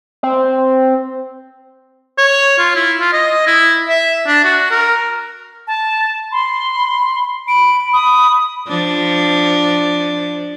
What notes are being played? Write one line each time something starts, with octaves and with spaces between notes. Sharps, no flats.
C4
C#5
F4
E4
F4
D#5
E4
E5
D4
F#4
A#4
A5
B5 C6
B5 D7
B5 D#6
F3 D4